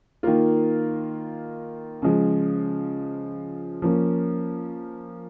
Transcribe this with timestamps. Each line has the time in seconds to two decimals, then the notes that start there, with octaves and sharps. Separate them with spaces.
0.23 D#3 A#3 F4
2.02 C#3 F3 G#3
3.82 F3 A#3 C#4